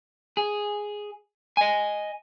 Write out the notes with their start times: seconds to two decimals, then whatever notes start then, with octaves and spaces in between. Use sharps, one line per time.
0.37 G#4
1.57 D#5 G#5